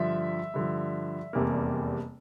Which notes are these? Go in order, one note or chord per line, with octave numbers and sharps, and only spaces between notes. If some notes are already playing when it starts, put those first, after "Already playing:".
Already playing: G2 D3 F3 E5
G2 D3 F3
F1 E2 C3 G3 A#3